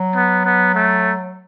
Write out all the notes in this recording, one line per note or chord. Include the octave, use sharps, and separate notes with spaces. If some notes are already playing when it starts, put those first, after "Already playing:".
Already playing: F#3
B3
B3
A3